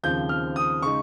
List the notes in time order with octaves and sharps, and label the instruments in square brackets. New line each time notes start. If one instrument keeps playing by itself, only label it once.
[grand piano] D#2 C#3 F3 C4 G6
F6
D#6
C#3 G#3 D#4 C#6